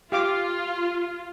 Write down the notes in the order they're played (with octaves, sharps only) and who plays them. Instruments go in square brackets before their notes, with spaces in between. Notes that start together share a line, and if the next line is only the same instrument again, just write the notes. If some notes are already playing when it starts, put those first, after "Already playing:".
[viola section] F4 [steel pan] G4 F5 D6